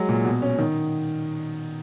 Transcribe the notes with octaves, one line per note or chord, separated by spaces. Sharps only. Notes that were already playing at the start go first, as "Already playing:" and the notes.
Already playing: F#3 G#3
A#2
B2
C#4
D#3